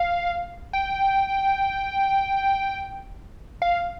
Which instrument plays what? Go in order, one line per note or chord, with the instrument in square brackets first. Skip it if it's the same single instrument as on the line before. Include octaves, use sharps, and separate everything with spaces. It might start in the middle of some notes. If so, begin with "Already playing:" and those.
Already playing: [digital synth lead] F5
G5
F5